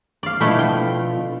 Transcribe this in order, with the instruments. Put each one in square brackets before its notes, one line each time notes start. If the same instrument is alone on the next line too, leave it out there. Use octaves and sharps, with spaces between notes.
[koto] D5 F5
[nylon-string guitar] B2 D3 F3 [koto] A3 E4 A4
[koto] G5